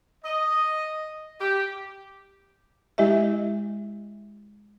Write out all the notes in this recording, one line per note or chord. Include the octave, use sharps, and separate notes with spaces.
D#5
G4
G#3 E4 G4 D#5 E5